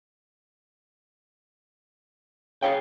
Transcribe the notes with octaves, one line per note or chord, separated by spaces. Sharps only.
C#3 G#4 C#5 G5